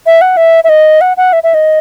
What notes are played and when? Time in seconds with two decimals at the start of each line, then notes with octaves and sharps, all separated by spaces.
0.06 E5
0.21 F#5
0.37 E5
0.64 E5
0.69 D#5
1.01 F#5
1.17 F#5
1.33 E5
1.43 E5
1.54 D#5